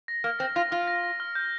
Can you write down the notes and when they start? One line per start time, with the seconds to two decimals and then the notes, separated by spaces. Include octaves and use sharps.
0.08 A#6
0.24 A#3 F6
0.39 C4 A#6
0.56 F4 A#6
0.71 F4 F6
0.87 A#6
1.04 A#6
1.20 F6
1.35 G6